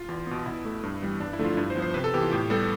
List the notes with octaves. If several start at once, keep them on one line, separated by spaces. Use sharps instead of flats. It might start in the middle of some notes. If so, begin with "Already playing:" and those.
Already playing: F4
E2
B2 B3
B2 E4
A3
G2
E3 G3 B3
G2 D4
E4
D3 F3 A3
F4
G2 E4
C5
F3 B3
C5
C3 B4
A4
E3 B3 G4
F4
A2 G4
G3 B3 A4